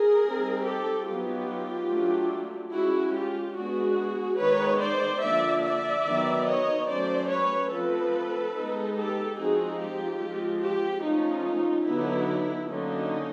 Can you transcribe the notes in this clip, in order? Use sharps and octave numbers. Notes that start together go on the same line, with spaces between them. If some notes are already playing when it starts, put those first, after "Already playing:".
Already playing: G#4 A#4
G3 C4 D#4
G4 A4
F#3 B3 D#4 F4 G4
F#3 A3 D4
G#3 C#4 E4 F#4
F4 G4
G#3 B3 D4 F#4 G#4
D#3 G#3 B3 D#4 B4 C#5
C5 D5
D3 F3 A#3 D5 E5
D5 E5
D#3 F#3 B3
C#5 D#5
F#3 A3 C#4 C5 D5
B4 C#5
F3 A3 C4 A4 B4
G#3 B3 D#4
G4 A4
F3 G#3 C4 D#4 F#4 G#4
F4 G4
F3 G#3 C4
F4 G4
F3 A3 C#4 D#4 F4
D3 F#3 B3 D#4 E4
D3 F#3 A#3 C#4 D#4